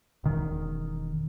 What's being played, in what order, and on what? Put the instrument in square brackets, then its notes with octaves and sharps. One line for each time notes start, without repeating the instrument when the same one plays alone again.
[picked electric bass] E1 D#3